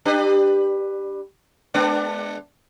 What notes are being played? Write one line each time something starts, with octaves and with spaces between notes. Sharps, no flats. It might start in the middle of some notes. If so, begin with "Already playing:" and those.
D4 G4 B4
G#3 B3 D4